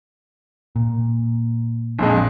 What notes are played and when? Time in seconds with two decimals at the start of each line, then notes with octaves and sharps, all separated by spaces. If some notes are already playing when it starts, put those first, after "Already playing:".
0.76 A#2
1.99 A#1 F2 G#3